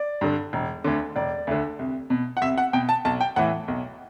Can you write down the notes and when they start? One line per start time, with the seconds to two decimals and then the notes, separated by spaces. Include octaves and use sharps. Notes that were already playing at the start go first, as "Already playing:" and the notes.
Already playing: D5
0.21 G2 D3
0.53 E1
0.84 D2 D3
1.16 E1 D5
1.47 D2 D3
1.79 C2
2.10 B2
2.37 F#5
2.42 C2 E5
2.58 F#5
2.73 B2 G5
2.89 A5
3.05 B1 A5
3.21 G5
3.36 A2 E3 F#5
3.68 B1